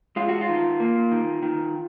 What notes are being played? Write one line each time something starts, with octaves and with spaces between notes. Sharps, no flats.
G#3 F4
F#4
F4
D#3
A#3
D#3
D#3